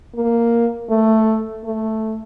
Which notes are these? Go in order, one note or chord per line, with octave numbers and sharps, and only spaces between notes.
A#3
A3
A3